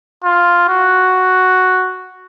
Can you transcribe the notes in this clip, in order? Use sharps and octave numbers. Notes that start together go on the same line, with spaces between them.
F4
F#4